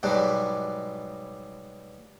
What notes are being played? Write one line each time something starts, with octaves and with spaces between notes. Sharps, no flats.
G#2 B2 F#3 G3 D4